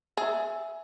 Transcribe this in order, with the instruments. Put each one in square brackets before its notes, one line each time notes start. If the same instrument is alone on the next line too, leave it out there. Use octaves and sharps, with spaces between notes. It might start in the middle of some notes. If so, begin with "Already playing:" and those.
[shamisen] G#4 [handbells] E5 E6